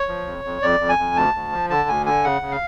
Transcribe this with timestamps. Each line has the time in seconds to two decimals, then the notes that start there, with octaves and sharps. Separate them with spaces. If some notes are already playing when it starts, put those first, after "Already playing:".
Already playing: C#5
0.08 F3
0.27 F2
0.45 F2
0.62 F2 D5
0.80 F2
0.89 G#5
0.98 F2
1.16 D2 A5
1.34 D2
1.52 F3
1.70 D3 A5
1.88 D2 G#5
2.06 D3 G#5
2.24 C#3 F#5
2.42 C#3
2.51 F5